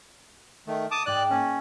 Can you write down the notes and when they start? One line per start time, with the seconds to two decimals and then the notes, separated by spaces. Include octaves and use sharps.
0.67 D#3 A3
0.91 A5 D6 D#6
1.06 G#2 G#3 D5 G5 F#6
1.30 A#3 C#4 A5